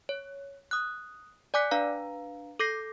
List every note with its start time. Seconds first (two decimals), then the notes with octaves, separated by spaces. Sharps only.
0.09 C#5
0.71 D#6 F#6
1.54 D5 G#5 D6 F#6 B6
1.71 D4 B4 F5 A#5
2.59 A4 D6 G6 A#6 C7